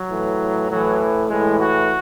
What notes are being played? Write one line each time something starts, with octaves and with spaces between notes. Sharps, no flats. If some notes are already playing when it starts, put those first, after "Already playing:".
Already playing: F#3
A2 E3
A2 E3 F#3
A2 E3 G#3
F#4